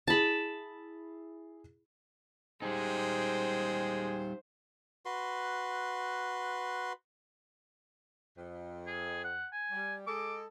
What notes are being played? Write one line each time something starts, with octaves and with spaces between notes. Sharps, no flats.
E4 G#4 A5 B5
G3 G#3 D#4 G#4 C5 G5
F#4 B4 C6
F2
G#4
F#5
G#5
G3
G#3 A4 D6